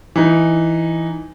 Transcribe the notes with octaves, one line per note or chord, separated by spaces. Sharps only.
E3 D#4